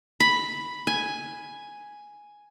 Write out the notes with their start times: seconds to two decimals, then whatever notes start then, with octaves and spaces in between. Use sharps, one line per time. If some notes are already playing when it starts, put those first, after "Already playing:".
0.20 B5
0.87 G#5